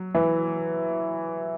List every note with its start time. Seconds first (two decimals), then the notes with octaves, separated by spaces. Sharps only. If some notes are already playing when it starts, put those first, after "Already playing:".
Already playing: F#3
0.15 E3